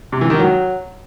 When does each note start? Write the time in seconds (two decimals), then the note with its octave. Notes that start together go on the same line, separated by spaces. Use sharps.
0.12 C3
0.21 E3
0.30 D#3
0.39 F#3